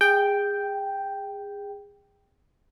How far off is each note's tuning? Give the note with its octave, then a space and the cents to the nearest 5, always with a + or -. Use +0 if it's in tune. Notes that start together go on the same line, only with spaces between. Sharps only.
G#4 -25 G5 +0